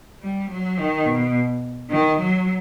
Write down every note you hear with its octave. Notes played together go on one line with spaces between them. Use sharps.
G3
F#3
D#3
B2
D#3
F#3